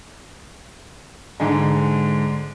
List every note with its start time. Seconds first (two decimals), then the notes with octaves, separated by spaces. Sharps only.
1.40 G#2 D3 G#3